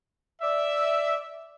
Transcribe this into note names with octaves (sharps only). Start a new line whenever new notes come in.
D5 E5